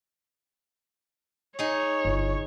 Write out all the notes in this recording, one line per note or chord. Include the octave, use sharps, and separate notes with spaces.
D#4 G#4 C#5
G1